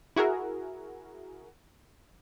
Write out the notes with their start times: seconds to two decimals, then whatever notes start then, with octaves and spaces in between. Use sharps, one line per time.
0.16 E4 F#4 G#4 A#4